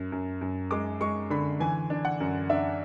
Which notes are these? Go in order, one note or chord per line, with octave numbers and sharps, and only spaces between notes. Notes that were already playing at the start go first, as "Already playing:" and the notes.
Already playing: F#2
F#2
F#2
G#3 D6
G#3 C#6
D3 B5
E3 G#5
D4
F#5
F#2
D4 E5